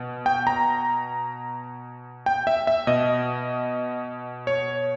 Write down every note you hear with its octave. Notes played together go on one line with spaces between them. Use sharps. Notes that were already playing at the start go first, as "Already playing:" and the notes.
Already playing: B2
G5
A#5
G5
E5
E5
B2 D#5
C#5